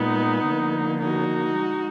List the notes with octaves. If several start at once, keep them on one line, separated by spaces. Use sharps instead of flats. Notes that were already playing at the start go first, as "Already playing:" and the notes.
Already playing: A#2 G#3 B3 D#4
D3 F3 A#3
D#4 F#4
G#3